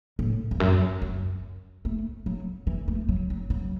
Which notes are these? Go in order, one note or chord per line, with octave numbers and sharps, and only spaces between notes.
A2
E2
F#2
F#2
A3
F#3
E3
A3
F#3
F#3
F#3